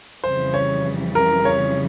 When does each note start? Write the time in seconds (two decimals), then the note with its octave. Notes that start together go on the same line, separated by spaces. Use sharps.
0.23 F2 C#3 E3 G3 C5
0.54 C#5
1.15 A#4
1.45 C#5